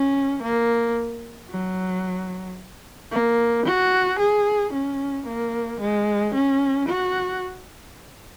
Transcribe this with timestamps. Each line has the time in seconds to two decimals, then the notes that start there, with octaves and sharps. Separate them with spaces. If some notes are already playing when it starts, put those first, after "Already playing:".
Already playing: C#4
0.43 A#3
1.51 F#3
3.12 A#3
3.66 F#4
4.19 G#4
4.73 C#4
5.27 A#3
5.81 G#3
6.35 C#4
6.88 F#4